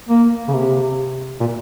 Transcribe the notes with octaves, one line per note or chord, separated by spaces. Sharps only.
A#3
C#3
C3
A#2